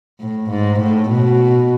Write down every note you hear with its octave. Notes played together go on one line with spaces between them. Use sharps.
A2
G#2
A2
B2